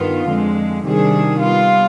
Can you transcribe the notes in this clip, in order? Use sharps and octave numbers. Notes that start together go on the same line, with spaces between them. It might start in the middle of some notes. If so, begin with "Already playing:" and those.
Already playing: G2 D#3 B3 F4
F2 D3 G#3
C3 D#3 G3 D4 G#4
G3 B3 F4